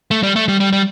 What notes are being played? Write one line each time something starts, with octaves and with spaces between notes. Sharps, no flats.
A3
G3
A3
G3
G3
G3